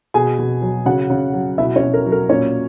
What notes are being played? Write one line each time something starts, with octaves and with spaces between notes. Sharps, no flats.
B2 G#4 G#5
B2
F#3
C#3 F#4 F#5
C#3
F#3
B2 E4 E5
C#4 C#5
B2
A#4
F#3
A#4
A#2 C#4 C#5